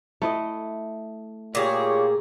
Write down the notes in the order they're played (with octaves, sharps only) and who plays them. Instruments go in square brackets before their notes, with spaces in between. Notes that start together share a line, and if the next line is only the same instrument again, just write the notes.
[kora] A3 E4 D#5
[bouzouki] A#2 G#4 [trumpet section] F4 G4 C#5